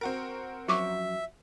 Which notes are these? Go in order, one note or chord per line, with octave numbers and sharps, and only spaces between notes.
C4 F#4 A#4
F#2 F3 F#3 E5 C#6 D6